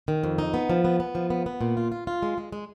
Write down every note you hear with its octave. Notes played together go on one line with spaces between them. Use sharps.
D#3
F2
D#4
B3
F3
B3
B3
F3
B3
B3
A#2
F4
F4
F4
G#3
G#3
G#3